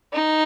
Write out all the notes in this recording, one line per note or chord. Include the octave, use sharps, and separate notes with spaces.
D#4